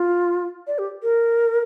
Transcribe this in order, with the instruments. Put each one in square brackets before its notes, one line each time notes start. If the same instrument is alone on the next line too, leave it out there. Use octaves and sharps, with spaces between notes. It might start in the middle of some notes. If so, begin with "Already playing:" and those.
Already playing: [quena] F4
D5
G4
A#4